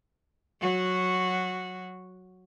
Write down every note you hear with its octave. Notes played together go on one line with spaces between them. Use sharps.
F#3 F#4